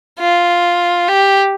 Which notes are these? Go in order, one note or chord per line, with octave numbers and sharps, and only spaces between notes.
F4
G4